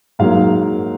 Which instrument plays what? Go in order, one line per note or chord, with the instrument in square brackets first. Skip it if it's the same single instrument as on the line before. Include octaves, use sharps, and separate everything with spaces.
[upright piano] G#2 F#3 A#3 F5